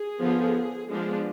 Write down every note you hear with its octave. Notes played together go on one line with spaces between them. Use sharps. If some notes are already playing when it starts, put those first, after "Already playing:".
Already playing: G#4
D3 F3 B3
F3 G#3 B3 D4